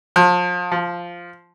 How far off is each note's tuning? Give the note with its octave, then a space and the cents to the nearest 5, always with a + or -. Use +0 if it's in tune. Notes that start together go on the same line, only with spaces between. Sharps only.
F3 +35
F3 +0